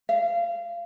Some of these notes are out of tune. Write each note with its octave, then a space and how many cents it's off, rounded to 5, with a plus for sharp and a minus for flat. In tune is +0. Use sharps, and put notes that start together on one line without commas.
F5 -25